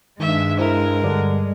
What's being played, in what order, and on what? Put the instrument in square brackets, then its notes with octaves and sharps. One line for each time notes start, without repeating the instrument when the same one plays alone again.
[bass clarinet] G2 [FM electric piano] D#3 [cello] G#3 [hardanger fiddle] E5
[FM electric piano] E4 C5 [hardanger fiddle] A#4
[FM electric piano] G2 G3 D5 [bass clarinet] D3